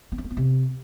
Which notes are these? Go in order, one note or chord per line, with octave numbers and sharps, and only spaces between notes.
B3
C#4
A#3
B3
C3